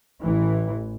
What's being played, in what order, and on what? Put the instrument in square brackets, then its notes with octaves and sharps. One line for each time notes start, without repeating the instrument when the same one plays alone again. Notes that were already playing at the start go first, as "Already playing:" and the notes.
[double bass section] A1 E3